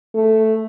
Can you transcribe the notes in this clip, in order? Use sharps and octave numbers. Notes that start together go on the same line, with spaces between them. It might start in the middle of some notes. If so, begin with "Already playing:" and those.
A3